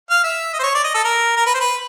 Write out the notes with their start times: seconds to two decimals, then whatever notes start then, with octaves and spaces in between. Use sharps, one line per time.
0.10 F5
0.24 E5
0.53 D#5
0.59 C5
0.63 C#5
0.74 D5
0.84 D#5
0.94 A4
1.04 A#4
1.37 A#4
1.46 B4
1.54 C5
1.60 B4